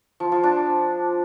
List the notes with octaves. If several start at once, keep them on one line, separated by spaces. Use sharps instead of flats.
F3
F3
D4